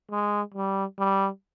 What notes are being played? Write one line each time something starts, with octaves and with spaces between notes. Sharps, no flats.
G#3
G3
G3